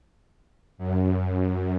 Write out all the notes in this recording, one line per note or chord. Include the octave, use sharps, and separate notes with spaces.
F#2